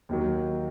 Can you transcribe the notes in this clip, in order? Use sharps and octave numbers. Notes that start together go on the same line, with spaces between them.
D#2 D#3 F#3